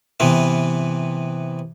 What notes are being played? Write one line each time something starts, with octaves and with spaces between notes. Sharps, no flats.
C3 E3 B3